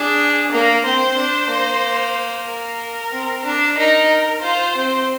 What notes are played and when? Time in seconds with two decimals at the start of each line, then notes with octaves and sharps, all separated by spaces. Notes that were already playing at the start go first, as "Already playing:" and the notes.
Already playing: D4 G#4
0.52 A#3 A#4
0.85 C4 C5
1.17 D4
1.49 A#3
2.47 A#4
3.12 C4
3.45 D4
3.77 D#4 A#4
4.42 F4 C5
4.75 C4